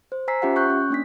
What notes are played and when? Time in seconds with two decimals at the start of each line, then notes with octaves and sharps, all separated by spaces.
0.12 C5
0.28 C5 G#5 A#5 E6 B6 C7
0.42 C#4 F4 G4 E5 F#5
0.56 C#6 F#6 G6
0.70 C#4
0.90 A#3 D4 B6